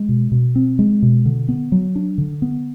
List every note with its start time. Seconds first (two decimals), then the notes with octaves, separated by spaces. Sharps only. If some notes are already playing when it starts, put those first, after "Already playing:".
Already playing: G#3
0.09 B2
0.32 B2
0.55 C4
0.79 G#3
1.02 B2
1.25 D3
1.49 B3
1.72 F#3
1.96 D4
2.18 D3
2.42 B3